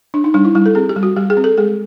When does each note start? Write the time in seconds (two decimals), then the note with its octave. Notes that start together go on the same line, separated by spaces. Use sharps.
0.14 D4
0.24 D#4
0.34 G3 D4
0.45 E4
0.55 G3 E4
0.66 A4
0.75 C4 G#4
0.89 G4
0.96 G3
1.03 F#4
1.16 G3 G4
1.30 G#4
1.37 C4
1.44 A4
1.57 G#3 G#4